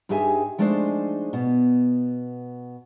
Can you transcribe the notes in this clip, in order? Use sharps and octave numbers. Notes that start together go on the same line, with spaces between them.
G2 D#4 G4 G#4 E5 G#5
F3 G#3 A3 D4 D#4 C5
B2 B3